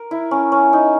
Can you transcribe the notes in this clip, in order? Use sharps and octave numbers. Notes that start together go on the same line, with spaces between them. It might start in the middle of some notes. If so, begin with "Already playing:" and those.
Already playing: A#4
E4
C#4
C#4
D#4